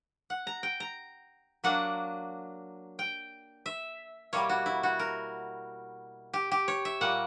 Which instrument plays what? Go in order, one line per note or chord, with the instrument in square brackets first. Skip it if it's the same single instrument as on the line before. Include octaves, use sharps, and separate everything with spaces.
[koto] F#5
A#5
G5
A#5
F#3 A#3 D4 F#5
G5
E5
B2 G3 A#3 E4 C#5
F#4
E4
F#4
A#4
G4
G4
C#5
E5
A#2 G3 A#3 F#5